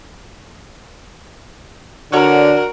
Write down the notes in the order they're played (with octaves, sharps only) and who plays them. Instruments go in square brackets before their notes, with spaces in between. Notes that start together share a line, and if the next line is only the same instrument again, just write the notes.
[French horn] D3 [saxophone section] F#4 [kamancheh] A#4 [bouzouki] C#5 D5 G#5